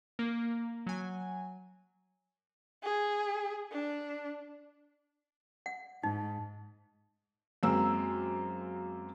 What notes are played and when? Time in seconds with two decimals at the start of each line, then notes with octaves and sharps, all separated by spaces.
0.19 A#3
0.86 F#3 G#5
2.83 G#4
3.72 D4
5.66 F#5
6.03 G#2 D#4
7.63 F#2 G#3 A#3 C4 E6